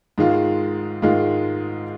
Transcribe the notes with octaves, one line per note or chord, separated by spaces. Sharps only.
G#2 D#3 G#3 F4
G#2 D#3 G#3 F4